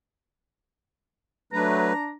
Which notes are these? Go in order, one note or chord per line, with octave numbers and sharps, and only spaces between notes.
F#3 A3 D4 B4 A#5